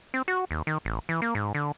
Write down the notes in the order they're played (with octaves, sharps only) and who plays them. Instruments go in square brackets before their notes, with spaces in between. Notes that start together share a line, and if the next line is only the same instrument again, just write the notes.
[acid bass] C4
F#4
D#2
D#3
A1
E3
A#3
G#2
D3